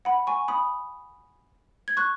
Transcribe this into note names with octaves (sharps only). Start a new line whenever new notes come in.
F#5 B5
G#5 C#6
B5 D#6
G#6
C#6 F#6